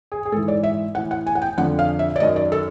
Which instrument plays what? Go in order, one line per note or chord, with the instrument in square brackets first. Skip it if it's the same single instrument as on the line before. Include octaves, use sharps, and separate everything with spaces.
[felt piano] G#4
G#4
G#2 A4
E3
D5
E5
A2 E3 F#5
F#5
G#5
F#5
G5
F2 D3 F3 F#5
F5
E5
D5
F#2 D#3 F#3 D#5
D5
A4